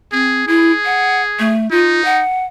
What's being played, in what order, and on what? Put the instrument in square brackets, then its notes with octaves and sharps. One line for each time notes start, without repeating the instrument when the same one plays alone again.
[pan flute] C4 [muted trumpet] G#4
[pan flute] E4 [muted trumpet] G#4
[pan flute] F#5
A3
[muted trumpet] D#4 [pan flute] F4
[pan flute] F#5